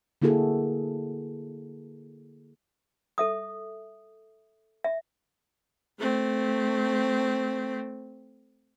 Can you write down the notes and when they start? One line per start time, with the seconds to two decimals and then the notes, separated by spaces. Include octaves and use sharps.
0.22 D3 A#3 E4 F#4 G#4 A4
3.18 A4 E5 D#6
4.84 E5
5.99 A3 C4